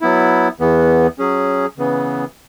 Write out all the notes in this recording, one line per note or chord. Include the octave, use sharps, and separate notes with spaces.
F#3 B3 E4
E2 E3 B3
F#3 C#4 G#4
C#3 E3 B3